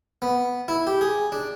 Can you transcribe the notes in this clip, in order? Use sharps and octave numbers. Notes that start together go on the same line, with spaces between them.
B3
E4
G4
G#4
D4